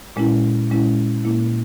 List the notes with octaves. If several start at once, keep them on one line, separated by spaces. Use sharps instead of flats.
A#2 G#3 C#4 E4
A#2 G#3 C#4 E4
A#2 A#3 E4